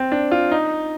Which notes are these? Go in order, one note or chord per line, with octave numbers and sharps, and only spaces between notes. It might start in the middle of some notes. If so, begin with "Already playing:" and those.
Already playing: C4
D4
F4
D#4